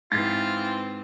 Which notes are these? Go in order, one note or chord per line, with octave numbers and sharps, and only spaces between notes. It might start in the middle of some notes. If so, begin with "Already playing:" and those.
G#2 E3 C4 F4 A6 B6 C7